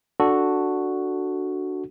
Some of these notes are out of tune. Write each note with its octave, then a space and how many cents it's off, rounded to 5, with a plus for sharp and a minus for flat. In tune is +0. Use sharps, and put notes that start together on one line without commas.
D4 +0 F#4 +0 A4 +0